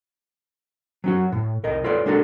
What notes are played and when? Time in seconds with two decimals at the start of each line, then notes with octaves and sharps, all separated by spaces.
1.04 F#3 C#4 F#4
1.32 A2
1.64 C2 A#4 D#5
1.84 F4 A4 B4 C#5 D5
2.06 G#3 D4 F#4 A4 A#4